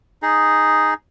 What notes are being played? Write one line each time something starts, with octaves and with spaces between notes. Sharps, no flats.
D#4 G#4